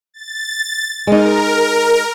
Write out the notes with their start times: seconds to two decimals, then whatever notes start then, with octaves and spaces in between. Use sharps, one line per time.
0.14 A6
1.07 G#3 D#4 A#4